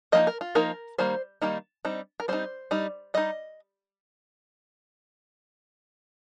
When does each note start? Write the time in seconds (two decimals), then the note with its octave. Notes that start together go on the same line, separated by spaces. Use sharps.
0.12 F3 A#3 D#4 D#5
0.27 A#4
0.41 F4
0.55 F3 A#3 D#4 A#4
0.98 D#3 G3 A#3 C5
1.42 D#3 G3 A#3 D#4
1.85 G3 C4 D#4
2.20 A#4
2.28 G3 C4 D#4 C5
2.71 G3 D#4
3.14 G3 D#4 D#5